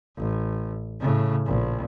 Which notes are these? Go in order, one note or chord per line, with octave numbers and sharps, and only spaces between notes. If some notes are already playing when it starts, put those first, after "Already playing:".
A1
A2 C#3
A#1